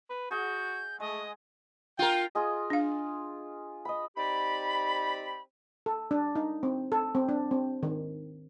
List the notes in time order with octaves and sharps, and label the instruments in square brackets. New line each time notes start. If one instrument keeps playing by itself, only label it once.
[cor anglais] B4
[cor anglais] F#4 [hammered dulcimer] G#4 D#5 F#5 [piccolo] G6
[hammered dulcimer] G#3 [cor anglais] A3 [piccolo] D#5
[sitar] F4 A#4 [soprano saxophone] G5
[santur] F4 G#4 D#5
[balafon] D4 F5
[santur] D#5 B5
[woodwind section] C4 D#4 G4 D5 B5
[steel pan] A4
D4
D#4
C4
A4
C4
D4
C4
D#3